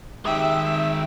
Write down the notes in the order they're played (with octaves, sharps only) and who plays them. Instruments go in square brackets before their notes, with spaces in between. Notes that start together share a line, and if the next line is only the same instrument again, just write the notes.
[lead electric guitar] D#3 G#3 [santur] G4 G5 D#6 [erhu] E5